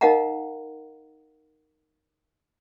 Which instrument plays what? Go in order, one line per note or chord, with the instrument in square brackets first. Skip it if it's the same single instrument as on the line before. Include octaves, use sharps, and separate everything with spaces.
[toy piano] D#4 A#4 D#5 F5 F#5 A#5